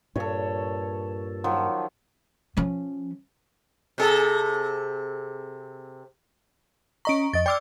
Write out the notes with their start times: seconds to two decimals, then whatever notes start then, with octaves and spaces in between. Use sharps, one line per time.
0.16 G2 A#2 A4 C#5
1.44 D#3 F3 F#3
2.57 F3 C#4
3.98 C3 G#4 A4
7.05 C#4 D#5 A#5 C#6 D7
7.33 F2 D#5 A6
7.46 D5 G5 D6 E6 F6